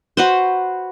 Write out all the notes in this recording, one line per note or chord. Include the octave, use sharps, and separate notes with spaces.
F#4 B4 C5